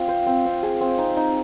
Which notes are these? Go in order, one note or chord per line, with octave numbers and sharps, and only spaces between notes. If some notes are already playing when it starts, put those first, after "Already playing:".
Already playing: C4 F4 F5
C5
C4
C4
G#4
C4
D#4
D#4